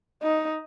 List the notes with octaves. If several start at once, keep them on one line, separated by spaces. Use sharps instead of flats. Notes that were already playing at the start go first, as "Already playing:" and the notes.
D#4